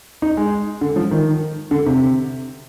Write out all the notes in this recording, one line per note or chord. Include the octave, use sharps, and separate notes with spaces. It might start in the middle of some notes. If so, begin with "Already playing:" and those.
D#4
G#3
D3
F3
D#3
D3
C3